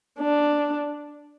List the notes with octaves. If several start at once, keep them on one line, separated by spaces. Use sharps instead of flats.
D4